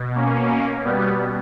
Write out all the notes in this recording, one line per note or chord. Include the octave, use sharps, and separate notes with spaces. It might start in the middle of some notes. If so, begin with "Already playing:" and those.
Already playing: B2
A#3 C#4
B2 G3 B3